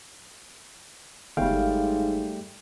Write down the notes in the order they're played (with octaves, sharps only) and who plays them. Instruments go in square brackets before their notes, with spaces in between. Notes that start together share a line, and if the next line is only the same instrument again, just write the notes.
[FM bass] G1 [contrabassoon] G#2 [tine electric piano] G3 A3 G5 [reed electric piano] F5